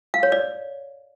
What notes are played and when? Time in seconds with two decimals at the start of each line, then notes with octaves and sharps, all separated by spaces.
0.14 F5
0.23 C#5
0.32 D5